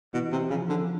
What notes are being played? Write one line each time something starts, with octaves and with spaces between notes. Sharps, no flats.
B2 E3
C3
C#3 F3
D3